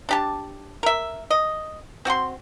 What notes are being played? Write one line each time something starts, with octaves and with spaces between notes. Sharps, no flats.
D4 G4 A5
A#4 E5
D#5
C4 F#4 F#5 C6